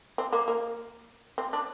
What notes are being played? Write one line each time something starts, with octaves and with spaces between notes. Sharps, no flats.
C4
A#3
A#3
C4
D4